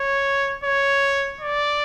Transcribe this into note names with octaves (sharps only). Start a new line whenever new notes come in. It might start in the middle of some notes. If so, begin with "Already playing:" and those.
Already playing: C#5
C#5
D5